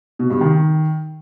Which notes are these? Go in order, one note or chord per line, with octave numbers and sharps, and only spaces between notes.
B2
G2
D#3